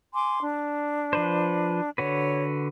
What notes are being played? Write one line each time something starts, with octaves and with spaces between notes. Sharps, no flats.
G#5 C6 D6
D4
F3 B4 C5
D3 F#4 B4 C#5